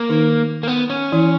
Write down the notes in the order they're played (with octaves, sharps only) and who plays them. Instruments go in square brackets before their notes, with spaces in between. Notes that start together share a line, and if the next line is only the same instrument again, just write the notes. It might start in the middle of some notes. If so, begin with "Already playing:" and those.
Already playing: [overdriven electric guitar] A#3
[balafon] D#3 D#4
[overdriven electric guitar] A#3
B3
C#4
[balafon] E3 E4